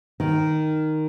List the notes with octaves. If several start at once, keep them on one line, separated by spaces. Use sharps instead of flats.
D#3